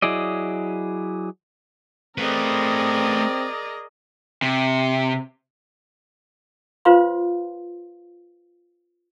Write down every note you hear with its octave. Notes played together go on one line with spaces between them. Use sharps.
F#3 E4 G#4 D5 D#5
A3 C4 G#4 A#4 B4 D5 D#5
C3
F4 B4 C5 F5 C6